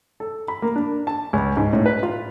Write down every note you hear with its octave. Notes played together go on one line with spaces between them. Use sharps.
A4
B5
A#3
D4
A5
C#2
G#2
A2
B4
F4